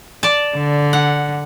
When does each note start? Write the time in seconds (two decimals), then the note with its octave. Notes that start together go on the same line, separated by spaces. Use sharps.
0.23 D5 A5
0.57 D3
0.93 F#5